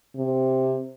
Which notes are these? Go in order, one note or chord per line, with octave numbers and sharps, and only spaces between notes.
C3